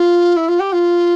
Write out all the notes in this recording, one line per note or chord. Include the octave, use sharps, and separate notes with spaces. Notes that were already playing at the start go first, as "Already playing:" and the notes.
Already playing: F4
E4
F4
G4
F4